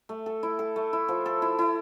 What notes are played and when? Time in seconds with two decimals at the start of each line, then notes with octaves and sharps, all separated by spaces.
0.09 A3
0.26 A4
0.43 E4
0.59 A4
0.76 A3
0.93 E4
1.08 F3
1.26 A4
1.42 E4
1.59 E4